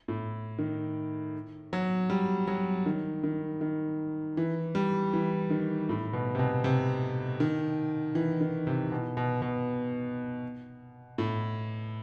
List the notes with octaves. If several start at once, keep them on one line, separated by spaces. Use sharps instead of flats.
A2
D#3
F#3
G3
F#3
D#3
D#3
D#3
E3
G3
E3
D#3
A2
B2
C3
B2
C3
D#3
E3
D#3
C3
B2
B2
B2
A2